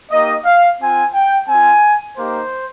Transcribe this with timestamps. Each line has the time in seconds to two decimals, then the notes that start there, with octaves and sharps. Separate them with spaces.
0.11 A#3 D#4 G4 D#5
0.45 F5
0.79 C4 F4 G#5
1.14 G5
1.48 C4 F4 G#5
2.17 A#3 D#4 G4 C5